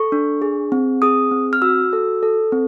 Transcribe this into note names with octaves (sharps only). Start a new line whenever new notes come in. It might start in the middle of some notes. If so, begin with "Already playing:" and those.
Already playing: A4 C#6
D4
G#4
C4
G#4 D#6
C4
F6
F#4 E6
A4
A4
C4